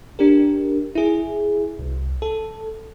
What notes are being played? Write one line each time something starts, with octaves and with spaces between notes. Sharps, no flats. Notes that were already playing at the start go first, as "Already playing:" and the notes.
D4 G4 A#4
E4 G#4
C2
A4